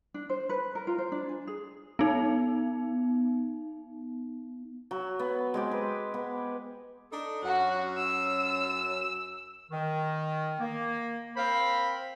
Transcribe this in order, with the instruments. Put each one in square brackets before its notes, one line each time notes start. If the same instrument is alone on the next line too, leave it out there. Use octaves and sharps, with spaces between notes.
[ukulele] D4
C5
B4
A#4
F4
C5
D4
G#5
G#4
[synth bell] B3 D#4
[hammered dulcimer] F#3
B3
G#3 C4 G4
B4
B3
[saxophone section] D4 D#4 A4
[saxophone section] F#2 C#4 [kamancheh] F#4 F#5
[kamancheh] E6
[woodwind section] D#3
A#3
C4 A#4 C5 F5 G5 B5